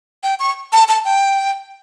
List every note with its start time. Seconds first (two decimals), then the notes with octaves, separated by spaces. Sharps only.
0.23 G5
0.40 C#6
0.73 A5
0.88 A5
1.05 G5